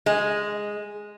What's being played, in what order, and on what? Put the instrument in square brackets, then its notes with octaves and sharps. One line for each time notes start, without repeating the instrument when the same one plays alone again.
[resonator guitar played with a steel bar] G#3